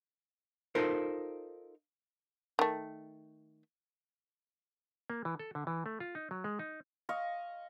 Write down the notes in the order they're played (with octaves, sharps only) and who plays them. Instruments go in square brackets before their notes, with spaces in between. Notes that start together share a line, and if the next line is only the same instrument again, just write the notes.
[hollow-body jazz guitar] D#4 F4 A4 A#4 C5
[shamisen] D#3 A3
[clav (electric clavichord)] A#3
E3
A4
D3
E3
A3
F4
D#4
F#3
G#3
D#4
[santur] D#5 F5 C#6